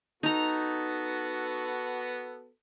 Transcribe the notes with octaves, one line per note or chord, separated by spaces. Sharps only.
B3 D#4 F#4 A4 A#5